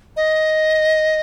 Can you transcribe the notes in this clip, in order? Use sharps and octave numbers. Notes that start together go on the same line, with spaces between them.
D#5